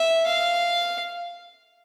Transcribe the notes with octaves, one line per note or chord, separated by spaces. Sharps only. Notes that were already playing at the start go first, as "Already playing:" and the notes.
Already playing: E5
F5